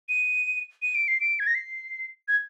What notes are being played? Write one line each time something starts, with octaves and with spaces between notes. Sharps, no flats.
D#7
D#7
D7
C7
D7
G#6
A#6
C7
G#6